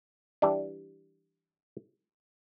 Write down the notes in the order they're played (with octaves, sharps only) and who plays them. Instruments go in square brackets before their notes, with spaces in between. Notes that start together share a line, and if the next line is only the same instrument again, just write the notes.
[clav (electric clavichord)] E3 G3 D4